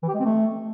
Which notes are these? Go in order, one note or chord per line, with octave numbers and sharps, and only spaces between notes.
E3
G4
G#3
C4
A3